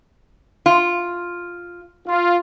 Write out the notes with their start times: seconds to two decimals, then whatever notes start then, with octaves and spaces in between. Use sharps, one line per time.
0.66 F4
2.08 F4